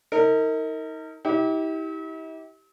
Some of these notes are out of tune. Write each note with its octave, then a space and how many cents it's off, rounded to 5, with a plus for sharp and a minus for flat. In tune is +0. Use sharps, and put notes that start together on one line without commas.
D#4 +35 A#4 -30
E4 -45 G4 -10